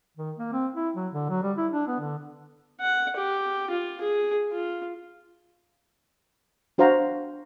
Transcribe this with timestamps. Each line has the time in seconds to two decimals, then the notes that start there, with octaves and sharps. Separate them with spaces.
0.17 D#3
0.39 A#3
0.53 C4
0.76 E4
0.96 F#3
1.13 D3
1.30 F#3
1.43 G3
1.57 E4
1.72 D4
1.87 B3
2.00 D3
2.81 F#5
3.16 G4
3.70 F4
4.01 G#4
4.53 F4
6.78 D4 F#4 C5 F5 A#5